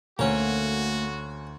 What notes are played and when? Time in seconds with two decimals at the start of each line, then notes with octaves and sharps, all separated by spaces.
0.19 D2 A3 A#3 C#4 F#4 A#5